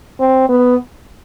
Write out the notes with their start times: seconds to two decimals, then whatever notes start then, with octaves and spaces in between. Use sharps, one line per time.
0.20 C4
0.49 B3